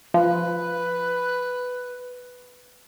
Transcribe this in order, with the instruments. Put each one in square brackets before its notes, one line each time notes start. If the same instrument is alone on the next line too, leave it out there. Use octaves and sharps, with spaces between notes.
[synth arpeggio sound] F3 [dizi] B4